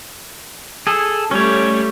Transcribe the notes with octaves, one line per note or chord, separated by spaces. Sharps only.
G#4 A4
G3 A3 C#4 C#5